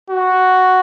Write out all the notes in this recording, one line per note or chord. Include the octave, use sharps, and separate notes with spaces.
F#4